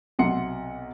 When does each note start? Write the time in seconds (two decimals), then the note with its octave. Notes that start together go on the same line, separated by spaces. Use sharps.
0.19 B1 C3 F#5 C6 C#7